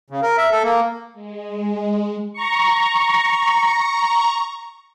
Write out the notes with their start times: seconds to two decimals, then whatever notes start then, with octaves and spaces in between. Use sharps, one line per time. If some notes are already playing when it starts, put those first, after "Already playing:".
0.10 C#3
0.22 A#4
0.38 E5
0.51 A4
0.63 A#3
1.13 G#3
2.33 A#5 C#6